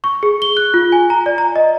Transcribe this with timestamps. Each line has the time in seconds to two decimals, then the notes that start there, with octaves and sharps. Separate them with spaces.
0.04 C#6
0.23 G#4
0.42 G7
0.57 F#6
0.74 F4
0.92 G#5
1.10 A#5
1.26 D5
1.38 A#5
1.56 D#5